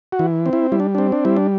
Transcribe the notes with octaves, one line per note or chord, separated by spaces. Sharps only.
F#4
E3
C4
E4
G3 E4
D4
C4 D4
D4
G3 E4
D4